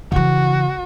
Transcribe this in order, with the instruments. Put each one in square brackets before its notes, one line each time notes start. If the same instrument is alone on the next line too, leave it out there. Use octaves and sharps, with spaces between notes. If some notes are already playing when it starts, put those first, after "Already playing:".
[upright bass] C#3 E3 [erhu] F#4